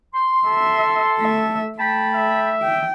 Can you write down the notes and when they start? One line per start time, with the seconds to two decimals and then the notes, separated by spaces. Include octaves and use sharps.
0.14 C6
0.47 A4 E5
1.19 A3 E5
1.79 A3 G5 A5 B5
2.14 E5
2.62 G5